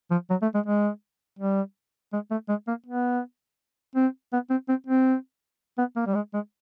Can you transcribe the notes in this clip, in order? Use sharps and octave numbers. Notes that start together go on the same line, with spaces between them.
F3
F#3
A3
G#3
G#3
G3
G#3
A3
G#3
A#3
B3
C4
B3
C4
C4
C4
B3
A#3
G3
G#3
G#3